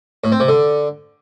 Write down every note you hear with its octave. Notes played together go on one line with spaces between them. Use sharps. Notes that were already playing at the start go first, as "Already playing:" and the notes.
A2
C4
C3
D3